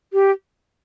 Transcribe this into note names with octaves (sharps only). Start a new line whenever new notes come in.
G4